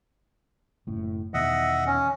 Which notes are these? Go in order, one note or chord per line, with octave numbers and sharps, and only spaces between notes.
F#1 A2
E2 B2 D#3 D#5 E5 F#5
C#4